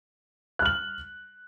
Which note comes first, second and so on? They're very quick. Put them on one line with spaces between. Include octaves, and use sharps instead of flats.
F#6 F6 F#7